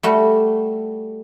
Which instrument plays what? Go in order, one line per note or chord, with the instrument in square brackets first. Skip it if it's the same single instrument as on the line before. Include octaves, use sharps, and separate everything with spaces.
[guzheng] G3 A3 F#4